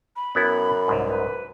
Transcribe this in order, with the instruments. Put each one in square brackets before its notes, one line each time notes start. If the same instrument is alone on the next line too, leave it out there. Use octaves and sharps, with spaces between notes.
[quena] B5
[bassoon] F#2 [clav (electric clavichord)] B3 E4 G4
[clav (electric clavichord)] C2 G#2
[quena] B4